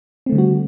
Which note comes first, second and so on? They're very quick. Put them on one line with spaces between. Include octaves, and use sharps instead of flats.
C4 A3 D3 G3 F#4